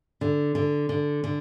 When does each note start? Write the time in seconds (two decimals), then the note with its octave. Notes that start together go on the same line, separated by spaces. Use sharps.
0.21 D3
0.55 D3
0.89 D3
1.24 D3